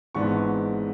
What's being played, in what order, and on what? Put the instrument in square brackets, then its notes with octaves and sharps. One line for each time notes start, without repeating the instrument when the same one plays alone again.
[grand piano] G#1 G#2 E3 B3 D4 C#6